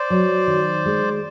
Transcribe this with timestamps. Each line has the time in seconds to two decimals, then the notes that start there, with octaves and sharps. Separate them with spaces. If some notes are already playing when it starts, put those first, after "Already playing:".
Already playing: C5 D5
0.10 F#3
0.47 D#3
0.86 G#3